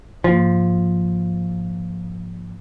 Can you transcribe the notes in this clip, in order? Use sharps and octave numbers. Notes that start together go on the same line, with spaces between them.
G#2 F3 A#3